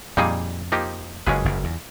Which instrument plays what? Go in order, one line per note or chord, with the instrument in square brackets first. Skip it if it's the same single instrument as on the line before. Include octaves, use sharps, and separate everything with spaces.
[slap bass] F2 [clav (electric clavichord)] A#2 G3 A#3 D#4 G#4
[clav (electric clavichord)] F3 A#3 D#4 G4
[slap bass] F#1 F#2 [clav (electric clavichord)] G#3 C#4 F4 G#4 B4
[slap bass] F#1 F#2
E2